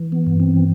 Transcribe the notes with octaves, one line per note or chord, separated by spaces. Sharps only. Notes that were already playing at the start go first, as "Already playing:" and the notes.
Already playing: E3
B3
G2
C4